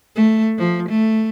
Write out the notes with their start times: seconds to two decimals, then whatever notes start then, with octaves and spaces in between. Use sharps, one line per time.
0.16 A3
0.58 F3
0.89 A3